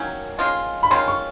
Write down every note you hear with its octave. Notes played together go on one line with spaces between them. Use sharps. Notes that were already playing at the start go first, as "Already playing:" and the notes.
Already playing: D#3 F#3 A#3 C#4
D#3 G#3 C#4 F4
B5
D#3 G#3 C#4 F4 C6
C#6